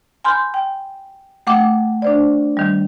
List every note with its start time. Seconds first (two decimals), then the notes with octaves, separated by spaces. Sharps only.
0.24 G#5 B5 C6 F6 G6
0.54 G5
1.47 A3 F#5 G5 D6
2.02 D4 C5 D5
2.57 D#3 G3